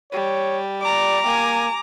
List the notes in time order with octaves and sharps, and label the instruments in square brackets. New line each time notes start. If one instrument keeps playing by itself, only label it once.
[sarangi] G3 [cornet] C#5
[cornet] D5 [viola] A#5 D6
[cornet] A#3 [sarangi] G#5